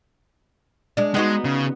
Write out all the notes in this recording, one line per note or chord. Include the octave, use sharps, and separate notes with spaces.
G#3 D4
G#3 B3 D#4 F#4
C#3